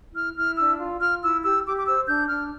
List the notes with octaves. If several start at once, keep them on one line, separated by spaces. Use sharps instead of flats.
E4 F6
E4 F6
D4 E6
F4
F4 F6
E4 E6
G4 E6
G4 D6
D6
C5 E6
D4 G6
D4 F6